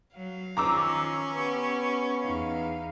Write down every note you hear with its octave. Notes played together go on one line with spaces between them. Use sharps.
F#3 F5
D#3 F3 C#4 A#5 D6 E6
B3 G4
E2 D#4 F5